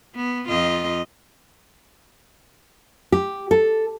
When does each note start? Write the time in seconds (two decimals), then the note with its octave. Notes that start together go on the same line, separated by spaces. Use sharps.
0.15 B3
0.49 F2 F4 D#5
3.12 G4
3.51 A4